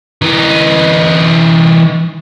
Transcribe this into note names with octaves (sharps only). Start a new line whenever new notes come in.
E3 D#4